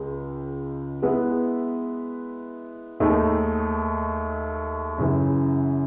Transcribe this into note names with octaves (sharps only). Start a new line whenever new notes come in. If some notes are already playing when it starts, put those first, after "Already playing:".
Already playing: C#2 C#3 G#3
G#3 B3 E4 B4
D#2 D#3 A3 D#4 G#4
F#2 C#3 E3